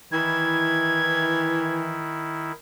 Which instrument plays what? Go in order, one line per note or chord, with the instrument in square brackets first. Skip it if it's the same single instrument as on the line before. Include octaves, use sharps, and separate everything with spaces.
[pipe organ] D#3 E4 [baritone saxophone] E3 [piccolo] G#6